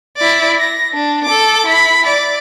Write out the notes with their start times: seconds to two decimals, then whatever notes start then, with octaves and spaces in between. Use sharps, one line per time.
0.17 E4 D5
0.59 A#6
0.94 D4
1.26 A4 D6
1.66 E4 B5
2.07 D5